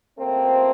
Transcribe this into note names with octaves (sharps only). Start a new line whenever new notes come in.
C#2 C3 F3 A3 A#3 C4